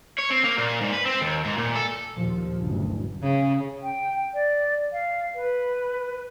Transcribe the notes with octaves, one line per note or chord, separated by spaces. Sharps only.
C#5
C4
A#3
A#2
G#2
B4
C4
D#2
G#2
A#2
A4
D#2 A#2 F3
F#1 D2 G2
C#3
G5
D5
F5
B4